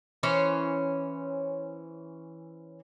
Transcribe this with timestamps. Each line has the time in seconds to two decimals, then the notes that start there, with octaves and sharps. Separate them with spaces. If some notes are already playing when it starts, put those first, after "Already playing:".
0.23 E3 C#4 C5 C#5